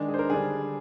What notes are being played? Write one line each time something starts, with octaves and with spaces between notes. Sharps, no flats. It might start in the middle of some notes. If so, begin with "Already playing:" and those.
Already playing: D#3 G#3 D4
G#4
C5
A#4
D3 G3 D4 G#4